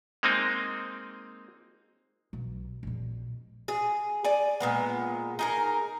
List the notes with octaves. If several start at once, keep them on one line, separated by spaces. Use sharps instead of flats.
G#3 A#3 C4 D#4
B1
A#1 B2
G#4
D5 G#5
A#2 G#3 B3
D#4 G#4 A#4